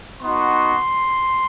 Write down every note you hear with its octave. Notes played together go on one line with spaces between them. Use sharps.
B3 D#4 F#4 C6